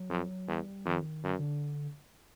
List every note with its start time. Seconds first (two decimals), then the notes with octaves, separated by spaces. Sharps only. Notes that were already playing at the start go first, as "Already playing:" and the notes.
Already playing: F#3
0.10 F2
0.48 E2 G3
0.86 F2 D#3
1.24 F#2 D3
1.39 D3